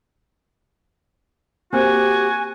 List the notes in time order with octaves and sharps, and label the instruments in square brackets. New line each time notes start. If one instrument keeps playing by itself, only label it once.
[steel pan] A#3 C4 [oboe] F#4 [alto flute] G4 [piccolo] G#5